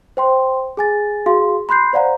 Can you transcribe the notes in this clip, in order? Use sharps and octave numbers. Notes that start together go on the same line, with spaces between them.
C5 G5 C6
G#4 G#5 A6
F#4 G#4 F5 C6
B5 C6 F#6 G6 C7
C5 D5 F5 F#5 A#5